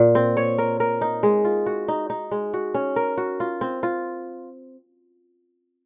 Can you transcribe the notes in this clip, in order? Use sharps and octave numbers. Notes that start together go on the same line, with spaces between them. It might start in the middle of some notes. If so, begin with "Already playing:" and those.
Already playing: A#2
C4
C#5
A#4
A#4
D#4
G#3
F4
F#4
D#4
D#4
G#3
F#4
C#4
A#4
F#4
F4
C4
F4